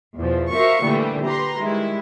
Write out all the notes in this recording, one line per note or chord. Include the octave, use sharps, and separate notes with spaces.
E2 B2 F3
F#4 A#4 C5 E5 F5 C#6
A#2 D3 E3 G3 A3
G4 B4 A#5 C6
D#3 G3 G#3 E4